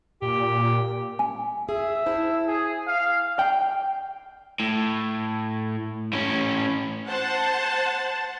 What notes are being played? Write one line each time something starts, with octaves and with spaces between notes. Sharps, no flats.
A#2 G4
G#5
G#4 E5
E4 C5 A5
G#4
F5
G5
A2
A2 C#4
C5 F#5 A5